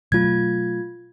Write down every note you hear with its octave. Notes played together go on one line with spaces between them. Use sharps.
B2 F#3 A3 F4 G#6